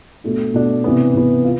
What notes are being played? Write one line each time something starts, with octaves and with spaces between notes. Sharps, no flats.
B2 A3 D4
B2 A3 D4
C3 E3 B3
C3 E3 B3
F4